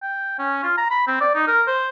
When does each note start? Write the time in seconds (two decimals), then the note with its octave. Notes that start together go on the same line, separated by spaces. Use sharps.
0.02 G5
0.39 C#4
0.63 F4
0.77 A#5
0.90 B5
1.07 C4
1.21 D5
1.35 D#4
1.47 A#4
1.67 C5